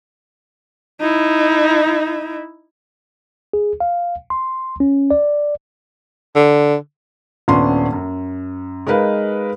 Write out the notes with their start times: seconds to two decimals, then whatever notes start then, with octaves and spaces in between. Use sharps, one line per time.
1.01 D#4 E4
3.53 G#4
3.80 F5
4.30 C6
4.80 C#4
5.11 D5
6.35 D3
7.48 D#1 B3 C#4 D4 C6
7.93 F#2
8.87 G#3 D#4 A#4 B4 F5